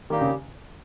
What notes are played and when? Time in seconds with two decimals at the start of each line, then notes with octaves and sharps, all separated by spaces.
0.10 D#3 G3 A#3 D#4 G4
0.21 C#3